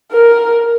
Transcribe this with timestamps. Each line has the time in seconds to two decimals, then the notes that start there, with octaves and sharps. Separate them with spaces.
0.12 A#4